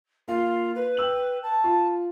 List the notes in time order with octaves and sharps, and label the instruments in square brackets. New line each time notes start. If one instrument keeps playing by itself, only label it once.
[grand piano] A#3 F5 [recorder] F4
[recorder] B4
[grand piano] G5 E6 F#7
[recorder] A5
[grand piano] F4